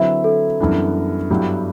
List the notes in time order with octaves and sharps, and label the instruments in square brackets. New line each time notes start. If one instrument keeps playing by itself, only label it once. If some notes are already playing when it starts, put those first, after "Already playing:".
Already playing: [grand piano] D3 F#3 C4 E4 B4 [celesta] E5
[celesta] A4
[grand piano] F#2 E3 G3 B3 D4
G2 F#3 B3 E4 G4